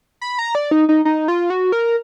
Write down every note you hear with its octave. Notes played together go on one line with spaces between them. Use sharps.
B5
A#5
D5
D#4
D#4
D#4
F4
F#4
A#4